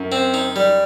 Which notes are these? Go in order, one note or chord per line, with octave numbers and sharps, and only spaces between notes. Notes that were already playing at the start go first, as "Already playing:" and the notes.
Already playing: F#2
C4
D#4
G3